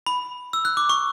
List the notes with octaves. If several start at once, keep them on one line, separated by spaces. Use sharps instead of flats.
B5
E6
F#6
D6
C#6